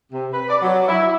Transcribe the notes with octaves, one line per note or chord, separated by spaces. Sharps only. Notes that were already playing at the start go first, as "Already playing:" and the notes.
C3
B4
D5
F#3
E4